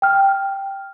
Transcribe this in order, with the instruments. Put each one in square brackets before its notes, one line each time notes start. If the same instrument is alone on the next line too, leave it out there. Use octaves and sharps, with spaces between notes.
[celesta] G5 F6